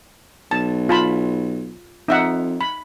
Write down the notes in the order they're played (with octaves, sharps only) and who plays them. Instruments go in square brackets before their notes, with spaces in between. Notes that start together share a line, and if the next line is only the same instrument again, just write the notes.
[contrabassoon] B1 [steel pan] A5
[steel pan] F4 A5 B5
[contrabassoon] F2 [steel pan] D#4 E5 F#5
[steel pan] B5